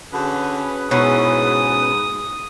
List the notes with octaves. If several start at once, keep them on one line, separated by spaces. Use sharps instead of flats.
D3 C#4 F#4 G#4 B4
G#2 B2 C#4 E4 D#6